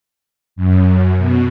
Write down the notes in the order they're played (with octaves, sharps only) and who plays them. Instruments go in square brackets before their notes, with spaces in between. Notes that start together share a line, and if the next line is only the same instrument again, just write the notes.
[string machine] F#2
B2